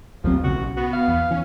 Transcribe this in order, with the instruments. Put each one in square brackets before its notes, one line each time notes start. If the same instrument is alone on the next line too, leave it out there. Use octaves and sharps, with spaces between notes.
[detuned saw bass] A1 [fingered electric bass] D#2 F#3 C4 [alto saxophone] F3
[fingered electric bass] B1 C#3 [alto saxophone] F#4
[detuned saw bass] B3 [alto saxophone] F#4
[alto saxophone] F5
[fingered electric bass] E2
[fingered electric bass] E3 [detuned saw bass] C#4